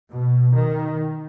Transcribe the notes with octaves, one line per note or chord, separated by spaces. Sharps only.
B2
D#3